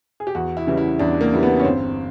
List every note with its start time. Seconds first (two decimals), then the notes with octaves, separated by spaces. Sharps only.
0.20 G#4
0.27 G4
0.35 E2 F#4
0.57 E4
0.67 C#3 E3 G3
0.77 E4
0.99 E2 D4
1.21 A#3
1.32 C#3 E3 G3
1.43 B3
1.60 C#4
1.64 G1 C4